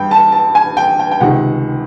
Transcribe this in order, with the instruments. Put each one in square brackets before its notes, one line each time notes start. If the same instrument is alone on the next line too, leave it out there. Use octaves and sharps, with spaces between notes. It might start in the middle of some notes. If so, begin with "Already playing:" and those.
Already playing: [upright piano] G2 G5
A5
A5
G#5
G5
G5
G5
C#2 C3 D#3 F#5